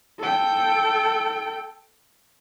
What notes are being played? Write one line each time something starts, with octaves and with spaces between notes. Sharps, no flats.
A4 G5